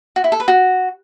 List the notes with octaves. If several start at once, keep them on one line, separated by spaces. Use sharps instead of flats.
F#4
E4
A4
B4
F#4